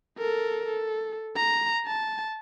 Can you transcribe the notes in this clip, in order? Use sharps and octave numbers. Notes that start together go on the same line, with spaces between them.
A4 A#4
A4
A#5
A5